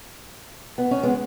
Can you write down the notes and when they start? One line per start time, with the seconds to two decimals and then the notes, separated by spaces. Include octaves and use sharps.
0.78 B3
0.91 C#4
1.03 G#3 B3